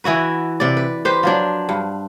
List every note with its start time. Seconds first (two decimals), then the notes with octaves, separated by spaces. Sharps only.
0.04 E3 E4 F#4 B4
0.60 C3 D5
0.77 B4
1.05 G4 B4 C5
1.23 F3 F#3 D4
1.69 G2